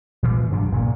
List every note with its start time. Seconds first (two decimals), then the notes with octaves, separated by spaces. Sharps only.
0.23 A#2 E3
0.51 G2 C#3 F#3 D4
0.72 F1 A#2 C#3 A#3